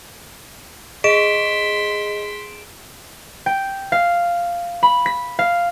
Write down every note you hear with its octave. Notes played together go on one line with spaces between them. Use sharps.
G#4 D#5 C6 B6 D7 E7
G5
F5
B5
B6
F5